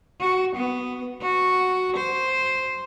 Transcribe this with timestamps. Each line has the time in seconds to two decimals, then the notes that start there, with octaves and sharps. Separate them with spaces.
0.21 F#4
0.56 B3
1.22 F#4
1.97 C5